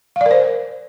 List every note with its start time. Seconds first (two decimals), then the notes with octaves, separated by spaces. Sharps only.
0.16 F5
0.21 D5
0.26 A#4
0.31 C5